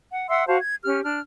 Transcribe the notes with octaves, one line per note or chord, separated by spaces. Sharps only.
F#5
E5 F#5 C6 E6
F#4 C5 F5 A5
G#6
C#4 G4 F6
D4 F6